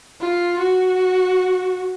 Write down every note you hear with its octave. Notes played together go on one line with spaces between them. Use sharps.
F4
F#4